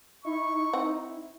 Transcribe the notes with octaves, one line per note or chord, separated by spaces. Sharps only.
D#4 E4 C#6
C4 F#5